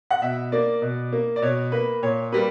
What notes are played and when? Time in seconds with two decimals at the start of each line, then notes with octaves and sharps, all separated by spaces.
0.11 F#5
0.22 B2 E5
0.52 A#3 D5
0.82 B2
1.12 A#3
1.36 D5
1.42 B2 C#5
1.72 A#3 B4
2.03 A#2 C#5
2.32 G3 A#3 B4